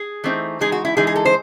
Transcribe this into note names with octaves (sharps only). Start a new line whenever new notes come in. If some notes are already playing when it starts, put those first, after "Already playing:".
Already playing: G#4
E3 A3 C4 D#4
E3 G#3 D#4 G#4
F#4
E4
E3 G#3 D#4 G#4
G#4
A4
C5